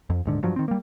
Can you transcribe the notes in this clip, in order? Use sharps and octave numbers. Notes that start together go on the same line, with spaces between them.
F2
D#1 G#2 D3
G2 F3 F#3
D#3 C4
G3 A#3